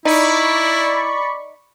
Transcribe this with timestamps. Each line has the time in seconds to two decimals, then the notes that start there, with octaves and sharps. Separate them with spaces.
0.05 D#4 E4 D5 B5 C#6